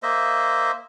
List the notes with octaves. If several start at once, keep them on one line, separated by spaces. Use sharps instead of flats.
A#3 C5 D#5 E5